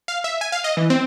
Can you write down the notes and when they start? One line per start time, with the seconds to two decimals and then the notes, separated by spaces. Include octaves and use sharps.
0.08 F5
0.24 E5
0.41 G#5
0.52 F5
0.64 D#5
0.77 E3
0.90 C4